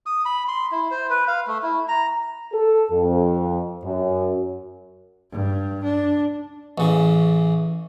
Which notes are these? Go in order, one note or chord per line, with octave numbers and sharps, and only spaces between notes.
D#6
B5
C6
E4
C5
B4
F5
A3
E4
A#5
A4
F2
F#2
G2
D4
A1 C#3